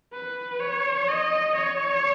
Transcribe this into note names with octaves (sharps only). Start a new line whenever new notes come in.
B4
C#5
D#5
C#5